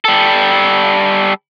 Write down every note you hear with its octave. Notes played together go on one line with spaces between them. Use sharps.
G3 A4